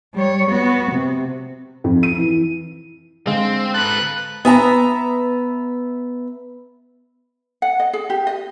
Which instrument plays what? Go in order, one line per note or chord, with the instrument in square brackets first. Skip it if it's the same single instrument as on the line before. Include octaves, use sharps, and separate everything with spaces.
[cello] G3 C#5
B3 F#4
C3
[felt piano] F2
D#7
E3
[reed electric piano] D3 G#3 F5 [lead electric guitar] C4
[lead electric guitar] A4 B4 [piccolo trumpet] F#6
[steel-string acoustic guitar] B3 E5 A5 A#5
[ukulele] F#5
D#5
G#4
G4
D#5